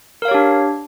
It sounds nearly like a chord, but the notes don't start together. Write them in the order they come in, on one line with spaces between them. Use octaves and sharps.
A#4 F5 C#5 G4 D4